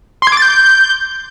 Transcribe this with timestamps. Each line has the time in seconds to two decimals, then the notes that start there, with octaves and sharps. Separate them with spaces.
0.22 C6
0.27 G#6
0.32 D6
0.37 A6
0.42 G6